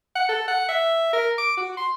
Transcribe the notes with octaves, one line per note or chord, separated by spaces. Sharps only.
F#5
A4
F#5
E5
A#4
D6
F#4
C6